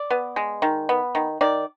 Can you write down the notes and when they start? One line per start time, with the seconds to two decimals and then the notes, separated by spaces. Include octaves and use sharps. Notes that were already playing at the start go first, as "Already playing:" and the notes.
Already playing: D5
0.10 B3
0.36 G#3
0.62 D#3
0.89 B3
1.15 D#3
1.41 D#3 D5